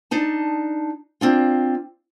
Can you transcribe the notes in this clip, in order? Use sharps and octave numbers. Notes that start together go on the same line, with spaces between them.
D4 D#4 A5
C4 D4 F4